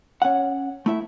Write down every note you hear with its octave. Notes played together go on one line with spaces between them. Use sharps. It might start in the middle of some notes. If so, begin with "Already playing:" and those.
C#4 F#5
A3 E4 E5